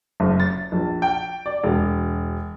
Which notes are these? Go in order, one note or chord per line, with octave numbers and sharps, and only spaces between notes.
F#1
A6
A#1
G5
D5
E1